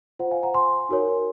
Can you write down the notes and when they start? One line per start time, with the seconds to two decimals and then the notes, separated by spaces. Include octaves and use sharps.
0.19 F4 C5 F#5
0.31 F5 G#5
0.43 F#5 A#5
0.54 G#5 C6
0.89 D#4 F#4 A#4 C#5